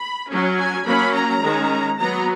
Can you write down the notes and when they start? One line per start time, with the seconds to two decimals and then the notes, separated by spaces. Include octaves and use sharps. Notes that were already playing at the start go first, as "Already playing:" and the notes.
Already playing: B5
0.30 F#3 C#4
0.59 G#5
0.86 F#3 A#3 C#4 B5
1.14 A#5
1.44 D#3 G#3 C#4
1.99 F#3 B3 A#5